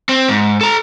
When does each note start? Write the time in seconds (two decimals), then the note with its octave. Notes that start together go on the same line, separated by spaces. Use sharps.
0.09 C4
0.29 G#2
0.61 A4 A#5